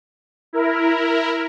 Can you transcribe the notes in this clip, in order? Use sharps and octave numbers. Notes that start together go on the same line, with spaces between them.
E4 A#4